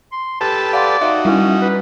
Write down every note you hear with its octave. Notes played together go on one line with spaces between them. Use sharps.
C6
G4 A4 B4 A5
D5 F5 F#5 C6
D#4 F#4 E5 F5
G3 C#4 E4
B4